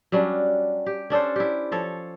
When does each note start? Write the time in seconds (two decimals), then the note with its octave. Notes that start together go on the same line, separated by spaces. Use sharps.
0.12 F#3 G3 C#4 D4
0.86 G4
1.10 C#4 D4 A4 C5
1.36 E4 G4
1.72 F3 A4 C#5